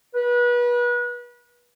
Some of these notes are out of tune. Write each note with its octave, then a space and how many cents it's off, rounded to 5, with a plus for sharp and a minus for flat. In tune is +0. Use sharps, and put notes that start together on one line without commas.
B4 -30